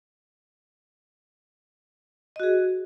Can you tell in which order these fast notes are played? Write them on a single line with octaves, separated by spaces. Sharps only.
D#5 F#4 G#4